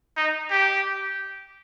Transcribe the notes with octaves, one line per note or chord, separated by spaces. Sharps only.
D#4
G4